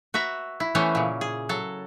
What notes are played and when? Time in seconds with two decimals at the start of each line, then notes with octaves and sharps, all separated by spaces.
0.14 F#4 B4 E5 A#5
0.60 E4
0.75 E3 A3 B3 C#4 C5
0.95 A#2 C#3
1.21 G#4
1.49 F#3 A4